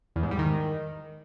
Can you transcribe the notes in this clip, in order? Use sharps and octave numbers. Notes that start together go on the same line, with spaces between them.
E2
G#2
G3
D#3